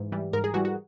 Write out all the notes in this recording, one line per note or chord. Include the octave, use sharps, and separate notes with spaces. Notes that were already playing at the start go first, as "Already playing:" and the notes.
Already playing: G#2 E3
E3 G3
G#2 A#4
G#4
E3 G3 F#4
F#4